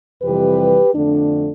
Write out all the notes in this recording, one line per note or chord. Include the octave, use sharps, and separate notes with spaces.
F2 C3 E3 G3 G4 B4
F2 D3 A3 D4